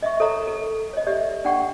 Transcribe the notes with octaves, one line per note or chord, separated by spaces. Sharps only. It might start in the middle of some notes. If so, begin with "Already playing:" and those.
D#5 E5 C#6
A4 C#5 D#5 A#5 C#6
A4
C#5 D#5
G4 D5 E5
D4 D5 F#5 G5 C#6